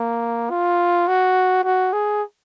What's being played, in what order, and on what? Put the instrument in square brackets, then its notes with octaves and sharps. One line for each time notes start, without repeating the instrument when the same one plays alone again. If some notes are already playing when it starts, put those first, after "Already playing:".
Already playing: [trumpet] A#3
F4
F#4
F#4
G#4